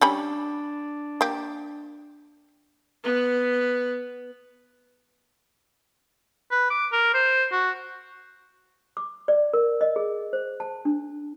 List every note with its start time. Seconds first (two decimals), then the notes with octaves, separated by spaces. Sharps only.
0.01 G3 C#4 D4 B5
1.21 A#3 G4
3.03 B3 B4
6.52 B4
6.71 D6
6.92 A#4
7.14 C5
7.52 F#4
8.97 D6
9.28 D5
9.53 A#4
9.81 D#5
9.96 G#4
10.33 C5
10.60 A5
10.85 D4